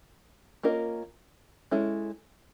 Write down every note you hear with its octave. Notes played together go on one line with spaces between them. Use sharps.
A#3 C#4 F4 A#4 D#5
G#3 C#4 E4 A4